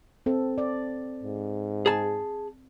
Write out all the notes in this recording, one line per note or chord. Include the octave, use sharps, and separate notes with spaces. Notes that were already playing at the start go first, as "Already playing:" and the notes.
C4 A4
D5
G#2
G#4 A5